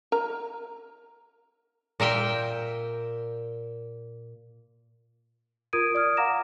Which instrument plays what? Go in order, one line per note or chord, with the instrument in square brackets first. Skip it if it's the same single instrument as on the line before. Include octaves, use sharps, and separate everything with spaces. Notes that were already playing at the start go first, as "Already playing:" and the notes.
[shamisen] A#4 A#5
[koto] A#2 A#4 E5 G5
[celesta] F4 A#4 D#6 G#6 D7 D#7
D5 D#6 F6
F5 F#5 A#5 D6 A#6 E7